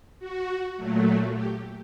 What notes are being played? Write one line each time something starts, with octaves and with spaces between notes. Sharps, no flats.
F#4
A#2 F#3 A3
G4